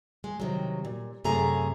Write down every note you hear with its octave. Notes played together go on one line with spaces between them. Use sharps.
G#3
C3 D#3 F#3
A#2
F#2 C3 A3 G#4 A#5